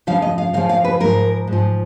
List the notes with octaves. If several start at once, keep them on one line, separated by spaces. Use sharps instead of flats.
F2 C#3 F3 F5
D#5
F5
F2 C#3 F3 F5
F5
B4
G#2 F3 A#4
G#2
F3